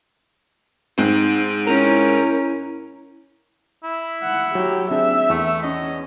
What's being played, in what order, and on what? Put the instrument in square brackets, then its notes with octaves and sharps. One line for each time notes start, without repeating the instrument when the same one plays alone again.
[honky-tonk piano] G#2 C4 [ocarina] D#4
[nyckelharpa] C#4 [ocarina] E4 [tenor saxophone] A#4
[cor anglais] E4
[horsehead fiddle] F#5
[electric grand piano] F#3 [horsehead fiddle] G4
[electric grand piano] C4 D4 G#4 [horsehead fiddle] E5
[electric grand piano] E2 [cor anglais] A3
[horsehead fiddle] C#4 [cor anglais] D#5